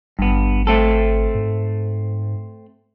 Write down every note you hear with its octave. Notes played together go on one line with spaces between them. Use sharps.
G#1 G2 B3
A3 C4 A4
G#2